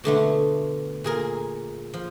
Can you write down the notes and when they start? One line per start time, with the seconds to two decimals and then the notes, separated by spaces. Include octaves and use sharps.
0.04 B2 D3 A3 B3
1.04 A#2 G#4 A#4
1.94 F3